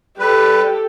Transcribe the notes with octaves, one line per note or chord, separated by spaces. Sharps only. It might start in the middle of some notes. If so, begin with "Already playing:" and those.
G3 G4 A4 B4